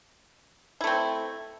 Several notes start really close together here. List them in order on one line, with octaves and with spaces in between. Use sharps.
E4 A3 C4